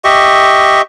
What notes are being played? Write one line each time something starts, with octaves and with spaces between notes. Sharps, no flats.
G4 D#5 E5 C#6